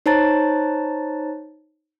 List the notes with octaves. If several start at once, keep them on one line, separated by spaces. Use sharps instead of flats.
D#4 C5 C#5 A5 A#5 A6